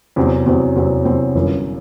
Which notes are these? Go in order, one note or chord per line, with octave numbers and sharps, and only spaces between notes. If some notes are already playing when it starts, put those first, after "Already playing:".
E2 C3 F#3 C4
E2 C3 F#3 C4
E2 C3 F#3 C4
E2 C3 F#3 C4
G1 F#2 E3